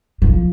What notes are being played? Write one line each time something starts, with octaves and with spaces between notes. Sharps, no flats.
F3